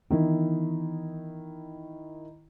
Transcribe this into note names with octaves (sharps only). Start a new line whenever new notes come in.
D#3 E3 B3 D4 E4